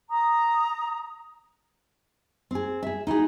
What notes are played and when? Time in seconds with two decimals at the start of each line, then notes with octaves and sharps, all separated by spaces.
0.09 A#5 D#6
2.51 C4 G#4
2.83 G#4 E5
3.07 D#4 E4 F#4 G#4